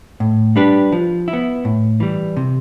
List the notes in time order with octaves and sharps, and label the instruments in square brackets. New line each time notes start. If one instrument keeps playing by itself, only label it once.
[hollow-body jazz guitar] A2
G3 D4 G4 B4
F3
E4
B3
A2
E3 G3
C3